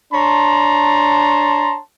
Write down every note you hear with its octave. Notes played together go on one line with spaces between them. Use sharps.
D4 C#5 A5 A#5 C6